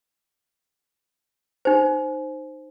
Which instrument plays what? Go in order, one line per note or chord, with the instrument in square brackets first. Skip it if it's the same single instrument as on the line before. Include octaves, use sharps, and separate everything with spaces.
[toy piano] D#4 C5